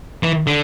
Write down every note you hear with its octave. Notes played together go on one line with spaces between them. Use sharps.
E3
D3